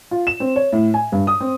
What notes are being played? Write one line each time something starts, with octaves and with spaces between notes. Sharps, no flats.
F4
E7
C4
C#5
A2
G#5
G2
D#6
C4